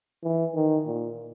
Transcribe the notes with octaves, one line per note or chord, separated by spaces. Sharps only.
E3
D#3
A#2